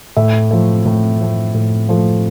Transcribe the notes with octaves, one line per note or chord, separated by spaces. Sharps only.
A2 E5
F3 A3
A2
F3 A3
A2
F3 A3